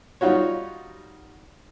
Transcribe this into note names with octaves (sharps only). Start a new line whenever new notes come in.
G3 D#4 F4 F#4 C#5